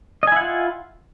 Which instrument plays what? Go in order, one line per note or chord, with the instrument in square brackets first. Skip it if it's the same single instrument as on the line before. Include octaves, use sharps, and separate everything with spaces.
[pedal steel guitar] D#5
G#5
E4
F#5
F4